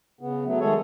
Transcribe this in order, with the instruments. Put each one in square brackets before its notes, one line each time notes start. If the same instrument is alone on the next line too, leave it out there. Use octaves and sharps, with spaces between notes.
[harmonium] C#3 B3
F#3 A3 B3
D#3 G#3 A3 G#4 A4 C#5